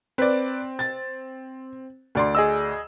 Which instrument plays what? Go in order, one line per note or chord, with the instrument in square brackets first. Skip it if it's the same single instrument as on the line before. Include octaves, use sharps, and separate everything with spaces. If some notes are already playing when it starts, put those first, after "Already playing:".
[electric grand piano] C4 [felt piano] B4 D5
[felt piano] A6
D2 D5 C6
[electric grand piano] G#4 D#5 E6